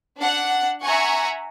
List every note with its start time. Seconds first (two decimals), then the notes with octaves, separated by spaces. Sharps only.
0.18 D4 F#5
0.84 E5 F#5 G#5 A#5 C#6